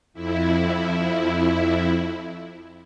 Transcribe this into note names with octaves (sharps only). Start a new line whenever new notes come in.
F2 E4